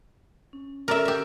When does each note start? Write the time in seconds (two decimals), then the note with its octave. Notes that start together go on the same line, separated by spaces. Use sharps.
0.53 C#4
0.88 C#4 A4 A#4 D5 E5
1.05 G4 E5